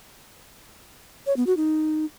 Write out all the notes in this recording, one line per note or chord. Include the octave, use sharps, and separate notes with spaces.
C#5
B3
F#4
D#4